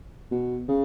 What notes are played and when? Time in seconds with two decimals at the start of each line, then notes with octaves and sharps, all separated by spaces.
0.31 B2
0.68 C#3